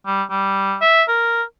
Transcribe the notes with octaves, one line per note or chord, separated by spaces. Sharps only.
G3
G3
E5
A#4